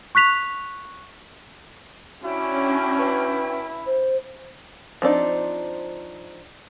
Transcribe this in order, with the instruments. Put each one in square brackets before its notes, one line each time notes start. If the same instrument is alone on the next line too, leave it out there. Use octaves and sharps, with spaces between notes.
[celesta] C#6 F#6 B6 F7
[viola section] C#4 D4 [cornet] E4 [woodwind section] F#4 G5
[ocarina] B4
C5
[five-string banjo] F3 C4 D4 D#4